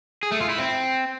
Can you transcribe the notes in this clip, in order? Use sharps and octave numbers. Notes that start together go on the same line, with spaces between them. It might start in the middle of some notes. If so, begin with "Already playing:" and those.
G#4
A3
F4
E4
C4